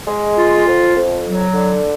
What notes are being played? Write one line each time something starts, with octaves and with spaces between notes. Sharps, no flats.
G#3
F4
F2
F2
F#3
D3